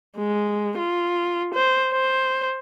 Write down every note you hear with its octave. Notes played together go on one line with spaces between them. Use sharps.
G#3
F4
C5
C5